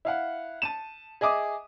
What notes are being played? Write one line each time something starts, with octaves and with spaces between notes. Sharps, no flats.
E4 F5 F#5
A5 D#7 E7
G#4 D#5 E5 D6 D#6